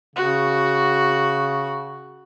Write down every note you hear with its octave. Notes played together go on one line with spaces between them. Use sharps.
C#3 F#4